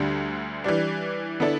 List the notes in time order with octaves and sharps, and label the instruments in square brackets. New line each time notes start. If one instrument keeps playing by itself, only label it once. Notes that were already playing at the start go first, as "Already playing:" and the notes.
Already playing: [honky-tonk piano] D2 D3 G3
E3 G3 D4
D3 B3 E4 A4 D5